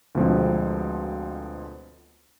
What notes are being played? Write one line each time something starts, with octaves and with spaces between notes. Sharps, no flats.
D2 B2 D3 F3 G#3 C4